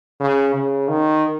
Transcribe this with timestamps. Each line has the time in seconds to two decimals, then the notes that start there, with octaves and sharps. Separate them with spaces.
0.20 C#3
0.54 C#3
0.88 D#3